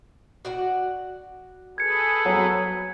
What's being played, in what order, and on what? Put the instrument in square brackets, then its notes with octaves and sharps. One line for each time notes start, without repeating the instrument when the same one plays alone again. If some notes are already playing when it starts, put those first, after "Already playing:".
[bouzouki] F#4 D5 F#5
[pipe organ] G#4 A4 B4 [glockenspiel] G#6 C#7
[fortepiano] F#3